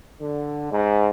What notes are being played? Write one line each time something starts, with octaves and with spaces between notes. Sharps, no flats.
D3
G#2